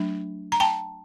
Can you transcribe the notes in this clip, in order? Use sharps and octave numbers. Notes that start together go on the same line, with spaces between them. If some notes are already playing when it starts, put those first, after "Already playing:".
Already playing: F#3 A3 D4
A#5
G5 A5